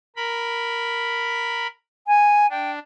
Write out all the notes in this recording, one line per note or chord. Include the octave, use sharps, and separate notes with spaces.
A#4 B5
G#5
D4 G5